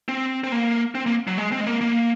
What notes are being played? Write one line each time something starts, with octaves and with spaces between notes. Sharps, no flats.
C4
C4
A#3
C4
A#3
F#3
G#3
C4
G#3
A#3
A#3